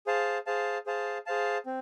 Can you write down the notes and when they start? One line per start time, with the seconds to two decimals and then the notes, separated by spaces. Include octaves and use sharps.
0.07 G#4 C5 F5 A5
0.46 G#4 C5 F5 A5
0.86 G#4 C5 F5 A5
1.26 G#4 C5 F5 A5
1.66 C4